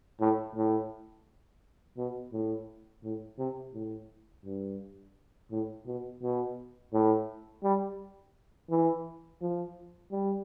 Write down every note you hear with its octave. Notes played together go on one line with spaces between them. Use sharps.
A2
A2
B2
A2
A2
C3
A2
G2
A2
B2
B2
A2
G3
E3
F3
G3